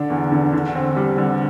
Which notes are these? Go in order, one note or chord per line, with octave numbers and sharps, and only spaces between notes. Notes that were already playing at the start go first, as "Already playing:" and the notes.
Already playing: D3 D4
E2
D3
D3
C4
G3
D3